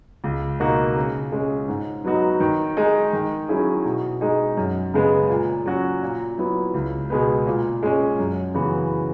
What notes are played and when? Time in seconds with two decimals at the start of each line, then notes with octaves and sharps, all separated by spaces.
0.24 C#2
0.60 B2 A#3 D#4 F#4
0.96 C#3
1.32 G#3 C#4
1.68 G#2
2.04 F#3 B3 D#4 F#4
2.40 D#3
2.77 G#3 D#4
3.13 D#3
3.49 F#3 C#4 E4 G#4
3.85 B2
4.21 G#3 D#4
4.57 F#2
4.94 C#3 G#3 B3
5.29 A#2
5.66 F#3 C#4 F#4
6.02 A#2
6.38 F#3 B3 E4
6.74 C#2
7.10 B2 G#3 B3
7.47 A#2
7.83 G#3 C#4
8.19 F#2
8.54 C#3 E3 B3 F#4